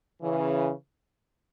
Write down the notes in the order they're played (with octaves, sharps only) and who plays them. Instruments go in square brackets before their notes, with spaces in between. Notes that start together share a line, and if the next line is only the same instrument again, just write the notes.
[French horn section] C#3 E3